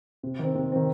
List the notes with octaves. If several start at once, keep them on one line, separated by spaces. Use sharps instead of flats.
C3
D#3 C4
C3
D#3 C4